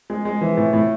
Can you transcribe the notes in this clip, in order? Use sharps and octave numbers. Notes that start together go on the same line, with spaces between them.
G#3
G#3
E3
A2
A2